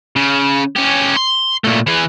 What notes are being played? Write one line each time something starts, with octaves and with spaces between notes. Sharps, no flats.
C#3
C#4 G4
C6
A#2 A3
E3 G#4